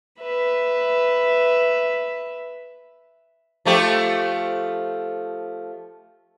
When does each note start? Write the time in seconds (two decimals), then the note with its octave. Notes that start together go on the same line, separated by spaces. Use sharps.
0.21 B4 E5
3.65 F3 A3 G4